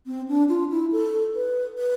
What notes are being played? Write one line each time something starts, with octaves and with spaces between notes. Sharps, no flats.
C4
D4
F4
E4
A4
B4
B4